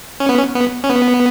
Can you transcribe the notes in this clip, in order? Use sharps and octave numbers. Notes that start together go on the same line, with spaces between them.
C#4
B3
C#4
B3
C#4
B3